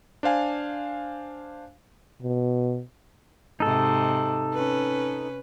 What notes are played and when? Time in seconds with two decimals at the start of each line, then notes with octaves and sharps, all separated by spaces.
0.23 D4 C5 F5 G#5
2.23 B2
3.60 G#2 C3 D#4 A4
4.54 C#4 B4